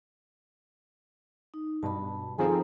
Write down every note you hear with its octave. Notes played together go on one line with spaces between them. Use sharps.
D#4
G2 B2 A5 B5
D#3 F3 C4 D#4 G#4 A4 A#5